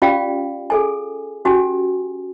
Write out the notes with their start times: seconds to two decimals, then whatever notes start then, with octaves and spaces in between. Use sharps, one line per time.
0.02 C#4 F4 G4 D5 F5 G5
0.70 G#4 A4 G#5
1.45 C#4 F#4 G4 G#5